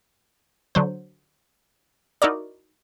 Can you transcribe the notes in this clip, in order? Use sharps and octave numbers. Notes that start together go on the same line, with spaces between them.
D3 F#3 C5
D#4 E4 F#4 A#4 D5